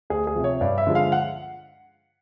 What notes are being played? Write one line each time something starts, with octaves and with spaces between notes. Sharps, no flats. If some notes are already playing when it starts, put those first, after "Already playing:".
D2 G#4
G#4
C3 F3
C#5
G2 D5
E5
D3 F3 G#3
F5
F#5